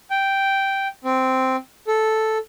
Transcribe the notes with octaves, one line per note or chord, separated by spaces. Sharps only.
G5
C4
A4